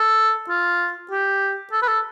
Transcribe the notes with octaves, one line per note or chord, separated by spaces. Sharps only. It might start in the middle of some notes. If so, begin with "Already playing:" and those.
Already playing: A4
F4
G4
A4
B4
A4